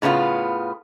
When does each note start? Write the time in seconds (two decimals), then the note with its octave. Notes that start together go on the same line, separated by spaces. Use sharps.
0.02 A2 C#3 B3 D4 F4